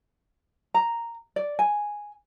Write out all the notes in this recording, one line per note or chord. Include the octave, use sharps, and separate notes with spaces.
A#5
D5
G#5